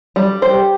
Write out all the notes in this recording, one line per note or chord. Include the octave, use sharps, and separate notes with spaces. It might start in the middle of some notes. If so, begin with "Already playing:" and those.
G3
G4 C5